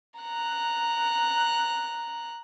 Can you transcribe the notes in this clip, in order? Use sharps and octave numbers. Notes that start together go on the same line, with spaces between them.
A#5 F#6